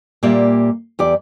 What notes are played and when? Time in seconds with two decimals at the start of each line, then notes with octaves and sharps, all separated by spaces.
0.23 A#2 G3 A#3 G4 D5 E5
0.99 E2 G4 D5